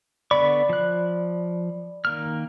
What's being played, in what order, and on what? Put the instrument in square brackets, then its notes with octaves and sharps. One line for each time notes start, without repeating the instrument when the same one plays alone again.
[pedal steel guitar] D3 B3 C#6 [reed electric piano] D5 B5
[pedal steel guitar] F3 F#6
D#3 A#3 F6